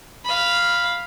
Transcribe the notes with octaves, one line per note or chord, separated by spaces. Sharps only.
F5 B5